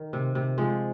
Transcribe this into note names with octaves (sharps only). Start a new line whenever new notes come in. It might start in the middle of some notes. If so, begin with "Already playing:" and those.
Already playing: D#3
C3
C3
F3 G#3